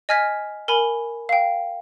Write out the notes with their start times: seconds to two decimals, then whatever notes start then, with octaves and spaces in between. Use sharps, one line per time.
0.09 D#5 G#5 F6 G#6 B6
0.68 A#4 G#5 B5
1.29 F5 G5